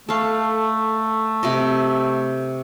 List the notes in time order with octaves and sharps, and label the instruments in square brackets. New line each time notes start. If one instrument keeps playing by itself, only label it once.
[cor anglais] A3 [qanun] A4 F5
[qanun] C3 G4 D#5